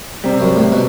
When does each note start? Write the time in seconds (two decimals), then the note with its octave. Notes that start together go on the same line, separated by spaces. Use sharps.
0.24 C3 G3 C4
0.40 F#2
0.56 A2
0.72 B2